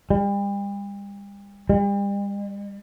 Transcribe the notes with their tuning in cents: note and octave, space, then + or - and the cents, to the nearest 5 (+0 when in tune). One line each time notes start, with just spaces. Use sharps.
G3 +40
G3 +40